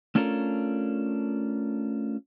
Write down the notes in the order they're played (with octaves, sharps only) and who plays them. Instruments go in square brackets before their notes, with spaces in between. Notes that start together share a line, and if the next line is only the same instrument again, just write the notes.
[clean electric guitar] A3 C#4 D4 F4 A4 A#4